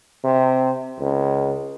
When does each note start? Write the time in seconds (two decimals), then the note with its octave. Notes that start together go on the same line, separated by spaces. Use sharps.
0.24 C3
1.00 C#2